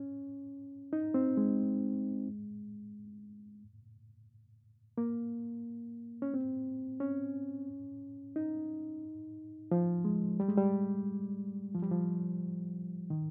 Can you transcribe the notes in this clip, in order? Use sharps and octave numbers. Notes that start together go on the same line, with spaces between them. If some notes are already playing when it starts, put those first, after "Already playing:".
Already playing: C#4
D#4
C4
G#3
A#3
C#4
C4
C#4
D#4
F3
G#3
G3
G#3
G3
F3
G3
F3
D#3